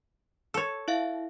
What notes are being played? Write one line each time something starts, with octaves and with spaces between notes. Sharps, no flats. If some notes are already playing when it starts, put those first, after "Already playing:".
A4 C#5 E6
E4 E5 F5